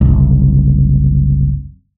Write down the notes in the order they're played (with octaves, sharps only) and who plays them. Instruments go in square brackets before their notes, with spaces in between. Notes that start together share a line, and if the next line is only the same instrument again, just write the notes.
[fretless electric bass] F#1 C2